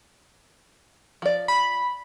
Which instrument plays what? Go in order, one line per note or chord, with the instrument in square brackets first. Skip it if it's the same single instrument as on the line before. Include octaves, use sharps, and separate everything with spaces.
[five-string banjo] F3 D5
[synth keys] B5